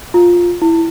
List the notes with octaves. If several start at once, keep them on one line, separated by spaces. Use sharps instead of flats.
F4
E4